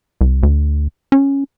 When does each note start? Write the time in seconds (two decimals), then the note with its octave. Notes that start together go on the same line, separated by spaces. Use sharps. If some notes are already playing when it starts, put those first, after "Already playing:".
0.21 C2
0.43 D2
1.12 C#4